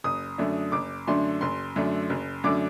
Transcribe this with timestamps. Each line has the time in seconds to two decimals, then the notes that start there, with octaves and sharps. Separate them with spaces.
0.04 F#1 D#6
0.38 F#2 D3 A3 D4
0.72 F#1 D6
1.07 F#2 D3 A3 D4 C6
1.41 F#1 C6
1.76 F#2 D3 A3 D4
2.10 F#1
2.44 F#2 D3 A3 D4 D6